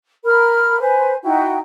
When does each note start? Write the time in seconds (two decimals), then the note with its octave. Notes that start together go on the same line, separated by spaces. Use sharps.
0.25 A#4 B5 F6
0.80 B4 C5 G#5
1.23 D#4 E4 F#4 G5